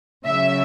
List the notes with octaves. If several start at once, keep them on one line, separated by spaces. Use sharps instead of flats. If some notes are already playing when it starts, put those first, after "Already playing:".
C#3 F#3 E5